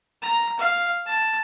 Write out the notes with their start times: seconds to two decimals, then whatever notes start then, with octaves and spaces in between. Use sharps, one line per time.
0.22 A#5
0.59 F5
1.06 A5